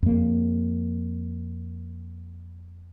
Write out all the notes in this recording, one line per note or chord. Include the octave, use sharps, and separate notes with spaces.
F2 A#3